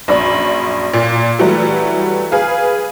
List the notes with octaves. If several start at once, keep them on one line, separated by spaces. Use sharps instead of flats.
A#1 F#2 D5 B5
A#2
E3 F#3 G3 A3
G#4 B4 F5